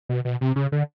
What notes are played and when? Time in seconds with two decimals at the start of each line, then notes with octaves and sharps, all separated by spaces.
0.09 B2
0.25 B2
0.41 C3
0.56 C#3
0.72 D3